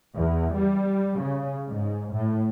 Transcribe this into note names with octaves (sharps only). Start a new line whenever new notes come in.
E2
G3
C#3
G#2
A2